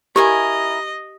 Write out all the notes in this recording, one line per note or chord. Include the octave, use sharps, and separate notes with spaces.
E4 G4 A#4 D#5 G#5